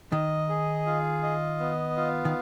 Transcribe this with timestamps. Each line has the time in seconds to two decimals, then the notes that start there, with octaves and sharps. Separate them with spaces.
0.12 D#3 D#5
0.49 G#4
0.86 F4
1.23 D#5
1.60 B3
1.97 F4
2.25 D#3